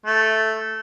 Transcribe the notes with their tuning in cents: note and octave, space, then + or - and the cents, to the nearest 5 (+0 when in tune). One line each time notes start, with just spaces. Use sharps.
A3 +0